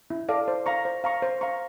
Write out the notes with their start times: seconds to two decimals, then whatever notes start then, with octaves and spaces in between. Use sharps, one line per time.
0.10 E4
0.29 A4 D5 F5
0.48 C5
0.66 F5 A#5 C#6
0.85 C5
1.04 F5 A#5 C#6
1.22 C5
1.41 F5 A#5 C#6